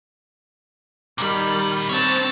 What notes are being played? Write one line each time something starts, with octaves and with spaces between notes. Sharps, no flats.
A#2 D#3 G3 B5
C4 D4 C#5 A5